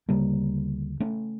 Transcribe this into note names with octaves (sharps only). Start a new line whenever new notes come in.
D2 C#3 G3 A#3
A3 C#4